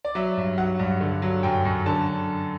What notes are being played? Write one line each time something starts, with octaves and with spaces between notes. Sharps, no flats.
D5
F#3 E5
G2
F#3 F#5
G2
D3
F#3
F#2 G5
F#2
D3 A5